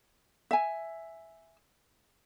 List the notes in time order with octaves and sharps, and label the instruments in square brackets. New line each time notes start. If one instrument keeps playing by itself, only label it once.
[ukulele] E5 G#5